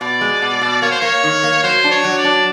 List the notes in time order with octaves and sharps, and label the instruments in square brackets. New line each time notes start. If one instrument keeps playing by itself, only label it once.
[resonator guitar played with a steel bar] B2 [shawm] D5
[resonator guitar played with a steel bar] G#3
B2
B2
[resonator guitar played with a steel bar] A#3 [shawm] C#5
[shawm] C5
[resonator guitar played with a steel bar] A#3 [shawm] C#5
[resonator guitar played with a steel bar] D#3
A#3
[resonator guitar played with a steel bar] F#3 [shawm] C5
[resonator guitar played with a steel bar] D4
[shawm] C#5
[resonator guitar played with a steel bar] F#3
[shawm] D5
[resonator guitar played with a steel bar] D4